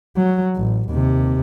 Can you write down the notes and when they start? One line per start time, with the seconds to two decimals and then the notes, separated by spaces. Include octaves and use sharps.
0.16 F#3
0.56 A1
0.89 D#2 C3